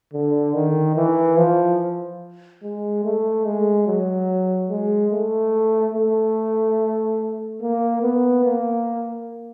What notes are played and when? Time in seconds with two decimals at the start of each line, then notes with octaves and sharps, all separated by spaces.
0.13 D3
0.54 D#3
0.96 E3
1.37 F3
2.63 G#3
3.04 A3
3.45 G#3
3.87 F#3
4.70 G#3
5.12 A3
5.95 A3
7.62 A#3
8.02 B3
8.44 A#3